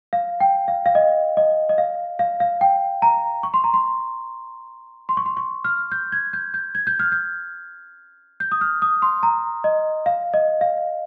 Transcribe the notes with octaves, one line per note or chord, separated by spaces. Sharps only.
F5
G5
F5
F5
D#5
D#5
D#5
F5
F5
F5
G5
A#5
C#6
C6
A#5
C6
C6
C#6
C6
C#6
F6
G6
G#6
G6
G6
G#6
G6
F6
G6
G6
D#6
F6
D#6
C6
A#5
D#5
F5
D#5
F5